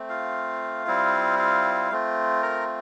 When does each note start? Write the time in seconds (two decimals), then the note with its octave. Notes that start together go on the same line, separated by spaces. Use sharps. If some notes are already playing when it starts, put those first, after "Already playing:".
Already playing: A3 C4
0.09 F4 F5
0.87 G3 C4 E4
1.39 F4 F5
1.91 A3 C4 F4
2.43 A#4 A#5